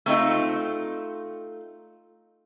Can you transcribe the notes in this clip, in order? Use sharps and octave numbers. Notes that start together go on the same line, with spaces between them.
A3 C4 D#4 F4